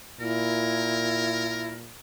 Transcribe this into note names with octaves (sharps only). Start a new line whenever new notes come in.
A#2 E4 A#4